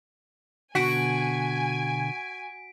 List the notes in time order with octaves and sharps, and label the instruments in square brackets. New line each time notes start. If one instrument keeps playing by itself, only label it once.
[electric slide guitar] B2 D3 [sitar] F#4 [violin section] G#5 [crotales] B6 D7